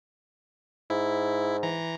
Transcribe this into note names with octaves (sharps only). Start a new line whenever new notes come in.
G#2 E4
E3 A#5